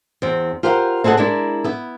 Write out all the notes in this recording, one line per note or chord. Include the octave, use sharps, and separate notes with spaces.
E2 C4
F4 G4 A#4 C5 F5 F#5
C4 G#4 A4 D#5 F#5
G#3 D4 E4 A#4
B3 E4